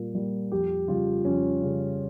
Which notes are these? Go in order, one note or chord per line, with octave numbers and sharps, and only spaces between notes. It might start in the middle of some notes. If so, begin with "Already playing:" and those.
Already playing: A#2 G3 A#3
G3 A#3
F2 G4
C#3 G3 F4
F2 C#4
C#3 G3